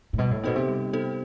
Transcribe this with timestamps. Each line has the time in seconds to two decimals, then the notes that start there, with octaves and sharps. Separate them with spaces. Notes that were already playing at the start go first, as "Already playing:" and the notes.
0.13 A2
0.18 B2 G3
0.31 A2
0.44 B2 B3 D#4 A4 C5
0.55 C3
0.69 G3
0.93 B3 D#4 A4 C5